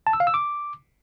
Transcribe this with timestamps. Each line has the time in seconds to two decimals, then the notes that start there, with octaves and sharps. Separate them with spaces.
0.07 A5
0.13 E6
0.20 F5
0.27 E6
0.34 D6